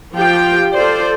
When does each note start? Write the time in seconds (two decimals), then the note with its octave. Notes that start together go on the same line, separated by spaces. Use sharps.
0.16 F3 F4 G4 G5
0.73 F4 A4 C5 D5